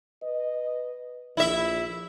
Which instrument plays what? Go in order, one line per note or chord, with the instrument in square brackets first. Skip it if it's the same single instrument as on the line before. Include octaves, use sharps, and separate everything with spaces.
[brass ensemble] B4 D#5
[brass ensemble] A#1 [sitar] E4 E5